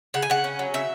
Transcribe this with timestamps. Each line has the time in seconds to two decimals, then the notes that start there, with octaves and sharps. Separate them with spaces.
0.14 C#3 F#5
0.22 G#5
0.30 C#3 F#5
0.44 C#4
0.59 F#3
0.74 C#3 E5